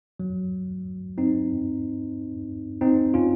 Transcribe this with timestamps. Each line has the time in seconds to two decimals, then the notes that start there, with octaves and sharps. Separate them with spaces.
0.20 F#3
1.18 C4 D#4
2.81 C4 D#4
3.14 C#4 F4